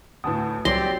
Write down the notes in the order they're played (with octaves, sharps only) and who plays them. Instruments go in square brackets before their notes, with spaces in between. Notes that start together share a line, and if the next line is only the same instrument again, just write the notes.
[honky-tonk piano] D2 A2 [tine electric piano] B4 A5 D#6
[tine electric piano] C2 A#6 [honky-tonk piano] F#3 [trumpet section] C4 G4 D5 [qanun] C6